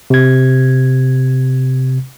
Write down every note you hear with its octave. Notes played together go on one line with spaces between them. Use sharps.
C3 G#6